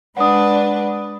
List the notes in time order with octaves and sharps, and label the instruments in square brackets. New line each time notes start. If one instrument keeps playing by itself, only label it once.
[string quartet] G#3 D4 B4 [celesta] F#5 D#6